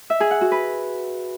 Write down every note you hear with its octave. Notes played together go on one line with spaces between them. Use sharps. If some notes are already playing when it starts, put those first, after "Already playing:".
E5
G#4
F#5
F#4
B4